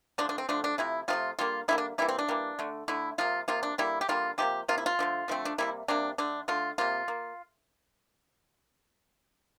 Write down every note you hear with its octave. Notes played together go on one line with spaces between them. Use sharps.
D3 F3 A3 D4
D4
C4
D3 F3 A3 D4
D4
C3 F3 A3 E4
C3 F3 A3 F4
D3 G3 A#3 F4
D3 G3 A#3 E4
D4
E3 G3 A#3 E4
C4
D4
E3 G3 A#3
D3 A3
D3 A3 E4
C3 F3 A#3 F4
C3 F3 A#3 F4
D4
D3 G3 A#3 E4
G4
D3 G3 A#3 F4
C3 F3 A#3 G4
C3 F3 A#3 F4
E4
F4
D3 F3 A3
D3 F3 A3 C4
D4
C3 G3 A#3 E4
C3 G3 A#3 D4
D3 A3 D4
D3 A3 F4
C3 G3 A#3 F4
A#3